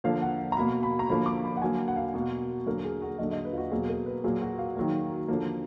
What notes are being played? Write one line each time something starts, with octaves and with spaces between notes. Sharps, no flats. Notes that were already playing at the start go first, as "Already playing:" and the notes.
D3 F3 A#3 F5
F#5
A#5
B2 A#3 B5
B5
A#5
D3 F3 A#3 B5
D6
B5
F#5
D3 F#3 A#3 G#5
F#5
F5
F#5
B2 A#3
D3 F#3 A#3 A#4
G#4
F#4
D3 F#3 A#3 D#5
D#5
B4
F4
F#4
B2 F#3 A#3 G#4
A#4
B4
A#2 F#3 A#3 G#4
F#4
F5
D#3 F#3 A#3
D3 F3 A#3